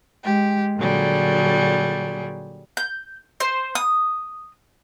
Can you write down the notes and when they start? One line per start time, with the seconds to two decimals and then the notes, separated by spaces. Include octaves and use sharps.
0.24 G#3 G4
0.78 A#2 D3 F#3 G3 G#4
2.77 G6
3.40 C5
3.75 D#6